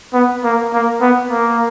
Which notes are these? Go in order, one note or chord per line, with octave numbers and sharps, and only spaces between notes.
B3
A#3
A#3
B3
A#3